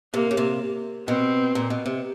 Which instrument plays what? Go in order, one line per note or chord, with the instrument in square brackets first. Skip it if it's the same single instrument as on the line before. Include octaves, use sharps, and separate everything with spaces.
[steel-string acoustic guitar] C3 [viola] A#3
[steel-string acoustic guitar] C#3
C3
[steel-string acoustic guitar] B2 [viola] C4
[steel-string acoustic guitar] A#2
B2
C3